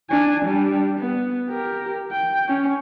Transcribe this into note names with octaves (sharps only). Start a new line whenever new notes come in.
D4 G#5
G3 D4
B3
G4 A#4
G5
C#4